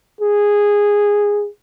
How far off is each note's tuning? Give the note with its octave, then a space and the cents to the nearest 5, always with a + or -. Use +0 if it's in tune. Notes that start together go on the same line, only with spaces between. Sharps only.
G#4 -10